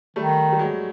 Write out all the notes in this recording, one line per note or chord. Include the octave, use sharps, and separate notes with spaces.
D#3 G3 A3
G3
F#3 G#3